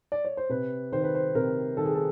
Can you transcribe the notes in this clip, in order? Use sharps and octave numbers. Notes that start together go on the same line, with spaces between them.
D5
C#5
C5
C3 B4
D#3 C5
B4
C5
C3 A#4
D#3 A4
G#4
A4